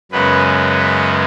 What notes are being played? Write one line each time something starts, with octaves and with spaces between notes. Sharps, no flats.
F#2 C#3 G#3 B3 B4
B4